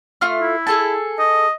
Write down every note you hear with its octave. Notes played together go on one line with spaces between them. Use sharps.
A3 F4 F6
E4
G#4 A4 A5
D#5